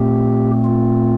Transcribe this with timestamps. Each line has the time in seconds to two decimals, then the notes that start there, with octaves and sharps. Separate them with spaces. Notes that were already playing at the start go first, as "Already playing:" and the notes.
Already playing: A#2 A3 C4 G4
0.65 F4